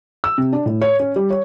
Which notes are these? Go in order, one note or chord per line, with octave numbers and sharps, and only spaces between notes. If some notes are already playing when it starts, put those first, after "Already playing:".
E6
C3
D4
A2
C#5
C#4
G3
C#5